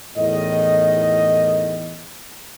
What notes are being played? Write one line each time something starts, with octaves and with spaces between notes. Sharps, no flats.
E2 A2 D#3 D#5